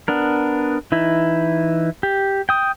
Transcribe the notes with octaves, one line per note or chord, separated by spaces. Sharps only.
B3 D4 A#4
E3 D#4 E4
G4
G5 D#6